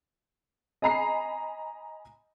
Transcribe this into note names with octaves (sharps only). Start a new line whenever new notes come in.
D#5 G#5 A#5 B5 C7